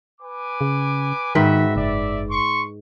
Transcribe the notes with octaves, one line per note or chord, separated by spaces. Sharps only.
B4 G#5 D6
C#3
G#2 D#3 F#4 B4 E5 G5
F#1 D5 E5
C6 C#6